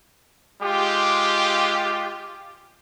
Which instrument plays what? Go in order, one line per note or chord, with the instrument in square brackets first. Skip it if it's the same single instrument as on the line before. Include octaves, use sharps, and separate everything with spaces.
[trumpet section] G#3 F4 G4